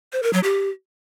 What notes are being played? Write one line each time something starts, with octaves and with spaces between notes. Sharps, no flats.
C5
A#4
F#3
G4